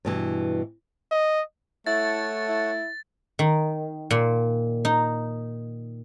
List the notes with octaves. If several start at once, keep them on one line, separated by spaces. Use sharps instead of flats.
G2 B2 E3
D#5
A3 E4 C#5 F#5 A5 A6
E4
D#3
A#2
D#4